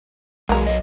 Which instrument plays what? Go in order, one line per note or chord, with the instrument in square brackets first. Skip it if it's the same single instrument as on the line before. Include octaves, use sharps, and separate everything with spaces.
[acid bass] B1 [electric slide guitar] G#3 F#4 G#4 [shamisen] A#3 A#5
[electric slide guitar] F#3 D#5